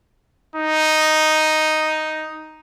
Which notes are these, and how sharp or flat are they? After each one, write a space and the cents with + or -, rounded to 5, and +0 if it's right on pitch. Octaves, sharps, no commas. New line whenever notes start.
D#4 +0